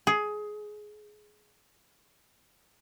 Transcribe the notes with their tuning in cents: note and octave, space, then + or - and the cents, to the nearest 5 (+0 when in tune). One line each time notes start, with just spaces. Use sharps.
G#4 +15